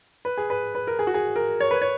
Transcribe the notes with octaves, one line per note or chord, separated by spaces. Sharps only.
B4
G#4
B4
B4
A#4
G#4
F#4
G#4
A#4
C#5
B4
C#5